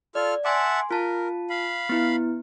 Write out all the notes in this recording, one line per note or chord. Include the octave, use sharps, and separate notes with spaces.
F4 A4 D5 F6
E5 F#5 G#5 A5 C6 D6
F4 A#4 A5
F5 B5
B3 E4